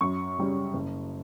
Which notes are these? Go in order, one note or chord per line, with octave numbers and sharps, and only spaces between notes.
F#2 C#6
C#3 G3 C#4
F#1